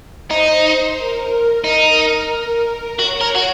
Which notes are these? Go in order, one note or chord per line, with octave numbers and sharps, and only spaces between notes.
D#4 C5
A#4
D#4 A#4
F#4 C#5
A#4
F#4